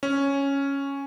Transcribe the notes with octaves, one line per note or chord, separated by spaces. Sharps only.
C#4